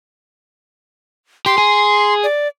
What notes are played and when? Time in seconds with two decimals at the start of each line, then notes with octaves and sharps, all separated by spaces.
1.46 G4 C6
1.58 G#4
2.24 D5